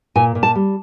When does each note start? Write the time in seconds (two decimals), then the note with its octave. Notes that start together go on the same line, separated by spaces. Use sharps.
0.16 A#2 G#5
0.35 A#2
0.43 A5
0.55 G3